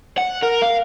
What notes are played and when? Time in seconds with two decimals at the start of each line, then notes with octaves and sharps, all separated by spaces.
0.18 F#5
0.43 A#4
0.62 F5